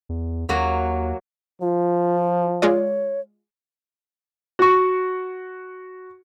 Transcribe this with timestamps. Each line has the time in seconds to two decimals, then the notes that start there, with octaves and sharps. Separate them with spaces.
0.09 E2
0.49 D#2 F#3 A#3 F#4
1.61 F3 F4
2.62 G#3 F4 C#5 D5
4.59 F#4 C#6